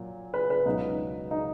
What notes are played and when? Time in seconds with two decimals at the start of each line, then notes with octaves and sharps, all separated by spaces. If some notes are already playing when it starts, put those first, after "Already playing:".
Already playing: A#2 F#3
0.34 B4
0.50 B4
0.66 C#2 B2 F#3 D#4
1.31 D#4